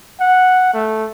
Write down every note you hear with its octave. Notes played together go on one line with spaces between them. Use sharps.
F#5
A3